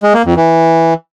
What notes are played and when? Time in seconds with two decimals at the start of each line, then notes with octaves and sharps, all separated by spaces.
0.03 G#3
0.14 A#3
0.25 F2
0.37 E3